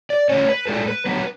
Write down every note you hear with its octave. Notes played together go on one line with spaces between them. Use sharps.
D5
D3 A3 C#4 C#5
B4
A2 G#3 D4 A4
B4
D3 F#3 B3 B4